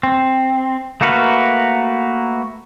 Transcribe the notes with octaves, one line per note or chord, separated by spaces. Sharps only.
C4
A3 A#3 F#4 A#4 B4